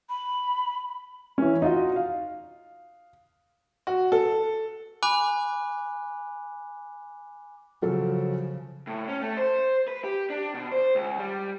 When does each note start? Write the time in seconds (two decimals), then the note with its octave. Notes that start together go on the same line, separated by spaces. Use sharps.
0.09 B5
1.38 E3 C#4
1.62 D#4 F4 F#4 D#5
1.96 F5
3.87 F#4
4.12 A4
5.03 G#5 B5 D6 F#6
7.82 C#3 F3 F#3 F4 A4
8.87 A2
9.08 C#4
9.22 A3
9.37 C5
9.88 B4
10.04 G4
10.30 D4
10.54 B2
10.71 C5
10.95 C#2
11.18 G3